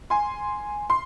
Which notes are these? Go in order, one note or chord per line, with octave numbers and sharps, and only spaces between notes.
G#5 C6
C6